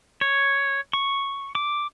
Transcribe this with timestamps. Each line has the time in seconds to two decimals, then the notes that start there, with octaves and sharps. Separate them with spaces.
0.21 C#5
0.93 C#6
1.55 D6